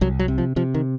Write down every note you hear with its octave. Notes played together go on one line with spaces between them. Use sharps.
C2 F#3
F#3
C3
F3
C3 F3
D#3